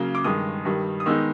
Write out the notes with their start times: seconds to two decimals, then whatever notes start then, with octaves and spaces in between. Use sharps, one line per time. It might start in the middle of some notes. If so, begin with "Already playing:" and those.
Already playing: C#3 F#3 A#3
0.15 D6
0.24 G2 D#3 G#3 D#6
0.65 G2 D#3 G3
1.00 D#6
1.06 D#3 G#3 B3 D#4 E6